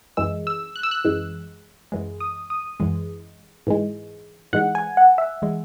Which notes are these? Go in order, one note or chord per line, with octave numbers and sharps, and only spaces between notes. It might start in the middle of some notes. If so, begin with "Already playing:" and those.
F#2 E3 G#3 E6
E6
F#6
E6
F#6
F#2 E3 G#3
F#2 E3 G#3
D#6
D#6
F#2 E3 G#3
G#2 E3 G#3
G#2 E3 G#3 F#5
G#5
F#5
E5
E3 G#3